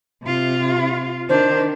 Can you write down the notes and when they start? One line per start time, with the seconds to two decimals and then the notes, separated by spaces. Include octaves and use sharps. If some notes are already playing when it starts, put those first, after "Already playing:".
0.23 C3 F4
1.29 D#3 D4 C5